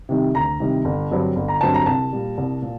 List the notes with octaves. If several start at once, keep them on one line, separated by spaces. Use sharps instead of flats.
C3 D#3 G3
D2 A#5
C3 D#3 G3
G1
G2 D3 F#3 C4
G1
A#5
G2 D3 F#3 C4 A5
A#5
C2 A5
A#2 G3
C2
A#2